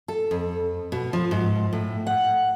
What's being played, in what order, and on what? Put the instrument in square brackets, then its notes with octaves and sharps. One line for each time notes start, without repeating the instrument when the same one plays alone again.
[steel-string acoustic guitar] A4
F2
B2
F3
G#2
A2
F#5